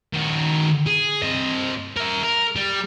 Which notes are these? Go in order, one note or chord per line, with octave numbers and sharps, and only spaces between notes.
D#3 F#4
G#4
C4 D#5
A#4 E5
A#4
G3